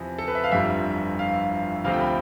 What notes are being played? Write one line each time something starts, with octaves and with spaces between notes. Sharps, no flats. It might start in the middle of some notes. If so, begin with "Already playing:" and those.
Already playing: E2 C3 F3
A4
B4
E5
F5
G1 F2 D3 G3 E5
F5
D2 C3 F3 A3 F5
G5
B5